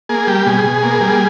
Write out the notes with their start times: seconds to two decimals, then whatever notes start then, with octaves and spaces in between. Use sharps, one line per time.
0.09 A#3 G#4
0.27 G3 G4
0.46 B2 G#4
0.64 B2
0.83 A#3
1.01 G3